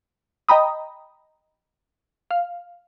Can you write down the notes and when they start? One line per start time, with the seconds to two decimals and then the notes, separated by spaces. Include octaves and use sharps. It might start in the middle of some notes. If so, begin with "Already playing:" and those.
0.49 D#5 G5 A#5 B5 D#6
2.31 F5